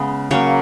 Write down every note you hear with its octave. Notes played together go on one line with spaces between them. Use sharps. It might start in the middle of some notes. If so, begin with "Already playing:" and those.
Already playing: C#3 G#3 B3
C#3 F#3 A#3 C#5